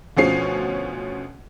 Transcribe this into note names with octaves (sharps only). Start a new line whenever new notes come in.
D2 B2 F3 C#4 C7